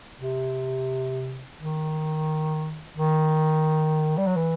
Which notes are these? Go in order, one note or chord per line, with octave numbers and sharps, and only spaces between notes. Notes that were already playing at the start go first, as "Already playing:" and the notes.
C3
D#3
D#3
G3
F#3
E3